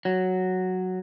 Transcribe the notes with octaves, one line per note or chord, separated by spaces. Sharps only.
F#3